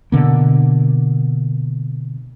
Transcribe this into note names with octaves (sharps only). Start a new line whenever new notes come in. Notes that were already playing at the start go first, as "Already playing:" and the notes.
B2 D3 A#3